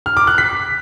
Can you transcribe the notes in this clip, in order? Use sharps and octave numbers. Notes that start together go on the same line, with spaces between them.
F6
D6
F#6
B6